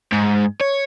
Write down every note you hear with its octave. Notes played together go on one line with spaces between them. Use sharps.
G#2
C#5